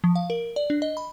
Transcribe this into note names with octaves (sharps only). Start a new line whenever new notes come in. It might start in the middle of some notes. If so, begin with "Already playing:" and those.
F3
F5
A#4
D5
D4
D#5
B5